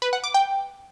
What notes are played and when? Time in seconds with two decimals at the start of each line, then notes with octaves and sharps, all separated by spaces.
0.02 B4
0.13 F#5
0.24 D6
0.34 G5